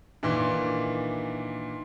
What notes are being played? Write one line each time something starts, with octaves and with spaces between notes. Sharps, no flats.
A#2 D#3 E3 D4